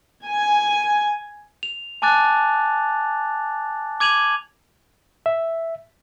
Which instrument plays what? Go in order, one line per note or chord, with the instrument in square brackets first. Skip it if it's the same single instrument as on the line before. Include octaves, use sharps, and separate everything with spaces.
[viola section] G#5
[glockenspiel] F7
G#5 A5 D6 F#6 A6
D6 G#6 D#7 F7 F#7
[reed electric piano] E5